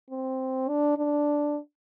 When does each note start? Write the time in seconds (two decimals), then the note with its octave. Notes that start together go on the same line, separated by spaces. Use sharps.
0.10 C4
0.68 D4
0.97 D4